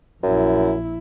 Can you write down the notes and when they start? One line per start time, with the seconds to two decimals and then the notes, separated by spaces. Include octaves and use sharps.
0.23 A#1 F#2 E4